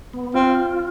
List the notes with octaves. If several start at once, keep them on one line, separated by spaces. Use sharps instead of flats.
B3
C4 F4